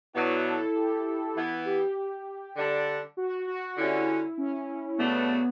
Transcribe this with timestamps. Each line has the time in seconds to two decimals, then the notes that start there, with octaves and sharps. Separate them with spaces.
0.14 B2 F#3 B3 D4 E4 F#4
0.45 A4
0.75 G4
1.36 E3 B3 E4
1.65 G4
2.56 D3 G3 D4
3.17 F#4
3.47 F#4
3.77 D3 G3 C#4 E4 F#4
4.38 C#4
4.98 C#3 F#3 A3 B3 D4 F#4